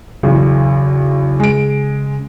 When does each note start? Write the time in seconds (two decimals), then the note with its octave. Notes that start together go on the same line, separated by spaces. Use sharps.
0.23 B1 E2 C#3
1.40 G#3 D7